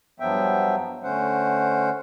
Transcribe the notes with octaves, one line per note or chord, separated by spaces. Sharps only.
G2 F3 F#3 B3 E5 G5
D3 A3 C#4 C5 F#5